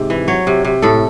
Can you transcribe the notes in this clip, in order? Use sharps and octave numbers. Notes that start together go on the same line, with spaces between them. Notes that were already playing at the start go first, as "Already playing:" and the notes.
Already playing: G#2 C3
E3
F#3 C#5
C3
C3
A2 A4